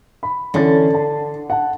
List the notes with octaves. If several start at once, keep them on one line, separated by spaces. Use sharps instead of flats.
B5
D3 E3 C#4 A6
A5
F#5 A5